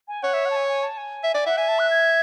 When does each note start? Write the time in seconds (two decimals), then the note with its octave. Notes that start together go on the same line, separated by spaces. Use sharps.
0.08 G#5
0.23 C#5 F#5
0.34 E5
0.46 F#5
0.51 A5
0.56 G#5
0.68 G#5
0.83 A5
0.98 G#5
1.24 E5
1.34 D5
1.46 E5 F#5
1.57 E5 G#5
1.68 A5
1.79 F#6
1.90 G#6